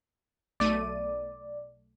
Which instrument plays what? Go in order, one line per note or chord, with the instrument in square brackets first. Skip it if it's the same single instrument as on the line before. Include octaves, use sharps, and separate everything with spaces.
[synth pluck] B1 A3 D#7 [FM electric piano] D5